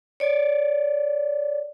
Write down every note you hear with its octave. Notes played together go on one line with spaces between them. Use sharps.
C#5 D5